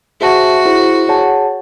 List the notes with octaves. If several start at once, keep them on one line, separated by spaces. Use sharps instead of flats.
F#4 G#4 C5 E5 A5
E4 G#4 C5
G#4 C#5 F#5 A5